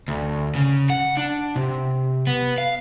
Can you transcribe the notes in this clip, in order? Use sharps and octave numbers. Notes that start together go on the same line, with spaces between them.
D2
C#3
F#5
D4
C3
B3
F5